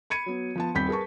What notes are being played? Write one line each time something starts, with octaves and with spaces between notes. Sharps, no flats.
B5 G#6 C#7 D#7
F#3 B3
F3 B3 A5
D#1 C4 B5 G6 B6
G#4 A#4 B4 A5 C#6